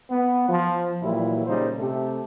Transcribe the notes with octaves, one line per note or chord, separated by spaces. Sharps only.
B3
F3
A#2 E3 F#3 G3 E4
A#2 C#3 G3 D#4 C5
C3 A3 G4 A4